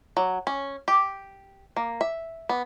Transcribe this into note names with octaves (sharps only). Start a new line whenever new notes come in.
F#3
C#4
G4
A#3
E5
B3